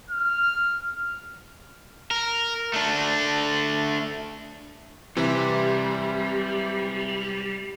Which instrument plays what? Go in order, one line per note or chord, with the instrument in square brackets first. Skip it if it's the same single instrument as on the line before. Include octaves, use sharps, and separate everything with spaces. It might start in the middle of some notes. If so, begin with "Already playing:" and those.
[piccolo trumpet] F6
[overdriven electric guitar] A#4
A3 D4
[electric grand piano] C3 E3 [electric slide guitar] G3 [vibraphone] C4 G4 E5